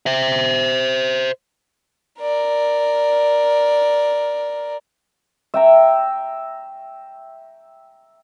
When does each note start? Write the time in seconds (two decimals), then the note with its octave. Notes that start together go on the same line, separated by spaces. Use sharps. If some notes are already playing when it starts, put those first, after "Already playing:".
0.06 C5 E5
2.21 A#4 D5
5.54 E5 G5 A#5